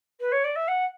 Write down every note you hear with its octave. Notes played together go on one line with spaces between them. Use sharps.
B4
C#5
D5
E5
F#5